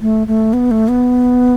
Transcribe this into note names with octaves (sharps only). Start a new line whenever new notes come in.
A3
A3
B3
A3
B3